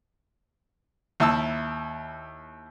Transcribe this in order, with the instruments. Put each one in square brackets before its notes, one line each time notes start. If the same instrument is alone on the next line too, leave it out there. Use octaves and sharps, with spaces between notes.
[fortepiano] D#2 E4 A5 E6